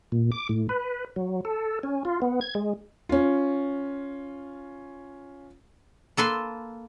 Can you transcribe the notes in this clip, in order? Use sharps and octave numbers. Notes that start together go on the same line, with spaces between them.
A#2
D6
A2
B4
F#3
A4
C#4
F4
B3
G#6
G#3
C#4 F4
A#3 A4 B4 C6